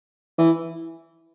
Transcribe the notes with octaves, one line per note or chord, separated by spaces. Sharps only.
E3